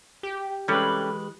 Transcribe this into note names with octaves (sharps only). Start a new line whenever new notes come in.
G4
C3 E3 G3 G#3 C#4 A4 B4